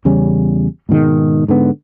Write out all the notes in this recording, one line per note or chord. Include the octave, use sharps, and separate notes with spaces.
E2 C#3 G3 C#4
G#2 B2 D#3 G#3
G#2 D3 B3